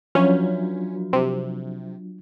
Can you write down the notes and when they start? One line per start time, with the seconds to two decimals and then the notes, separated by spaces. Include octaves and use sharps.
0.15 F3 F#3 C#4 D4 F4 F#4
1.13 C3